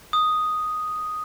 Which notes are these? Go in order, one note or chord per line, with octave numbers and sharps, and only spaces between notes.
D#6